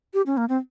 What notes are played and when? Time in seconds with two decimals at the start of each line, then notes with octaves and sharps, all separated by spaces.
0.14 G4
0.26 C#4
0.37 A#3
0.49 C4